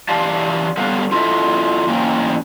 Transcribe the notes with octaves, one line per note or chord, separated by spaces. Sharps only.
E3 G4 D5 F5 A5
G3 B3 A4 B4 C#5 F5
E4 F4 A4 C#5 D#5 E5
G#2 E3 A#3 C#4 D#4 G5